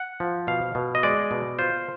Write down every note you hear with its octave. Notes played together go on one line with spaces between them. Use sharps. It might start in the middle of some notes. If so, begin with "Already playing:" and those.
Already playing: F#5
F3
B2 F5
B2
D#5
G#3 D5
B2
F4 C5